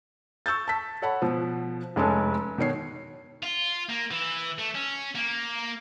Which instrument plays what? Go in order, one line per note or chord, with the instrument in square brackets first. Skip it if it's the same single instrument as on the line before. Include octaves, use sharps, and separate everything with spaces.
[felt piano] C#6 E6 G6 A6
A5 B6
A4 C#5 F#5 A5 B5
B2 F3
F1 G#3 C#4 A4
B2 D#3 C#5 C7
[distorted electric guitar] F4
A#3
E3
A3
C#4
A#3